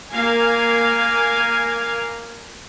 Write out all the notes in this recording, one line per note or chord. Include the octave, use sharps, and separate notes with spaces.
A#3 A#4 F5 G#5